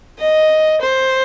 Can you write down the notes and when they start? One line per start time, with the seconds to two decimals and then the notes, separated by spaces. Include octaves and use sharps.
0.19 D#5
0.81 C5